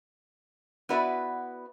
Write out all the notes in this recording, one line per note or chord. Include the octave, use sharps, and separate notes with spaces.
B3 E4 F#4 B4 D5 E5